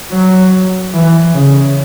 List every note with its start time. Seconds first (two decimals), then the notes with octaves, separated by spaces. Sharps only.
0.11 F#3
0.94 E3
1.34 C#3